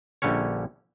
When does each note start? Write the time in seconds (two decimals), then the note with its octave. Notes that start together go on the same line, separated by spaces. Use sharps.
0.22 A#1 D3 G3 C#4 C#5